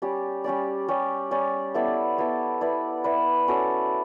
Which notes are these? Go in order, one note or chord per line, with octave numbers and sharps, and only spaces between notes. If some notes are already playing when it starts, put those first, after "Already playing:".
G3 C#4 G4 D5
G3 C#4 G4 D5
G3 C#4 G4 D5
G3 C#4 G4 D5
B3 E4 A4 D5
B3 E4 A4 D5
E4 B4 D5
E4 B4 D5
C#4 F#4 A4 D5